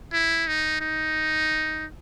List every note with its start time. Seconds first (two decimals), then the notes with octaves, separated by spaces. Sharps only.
0.13 E4
0.47 D#4
0.81 D#4